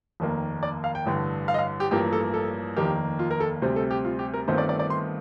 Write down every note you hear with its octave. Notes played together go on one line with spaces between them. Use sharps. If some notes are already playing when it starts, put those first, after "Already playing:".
F1 D#2 D#3 A#3
D5
F5
G5
A1 G2 D3
F5
D#5
F5
G4
A1 G2 F3 A#3 G4
A4
A4
F1 D#2 D#3 A#3 G4
F4
A#4
A4
D2 C3 G3 C4 C5
A4
G4
F4
G4
A#4
G1 G2 D#3 A3 C4 C5
D5
D5
D5
C6